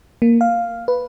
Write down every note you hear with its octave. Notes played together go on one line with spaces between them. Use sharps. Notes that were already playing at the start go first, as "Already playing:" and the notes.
A#3
F5
B4